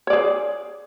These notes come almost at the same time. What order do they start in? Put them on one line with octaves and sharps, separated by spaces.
C#5 D5 G#4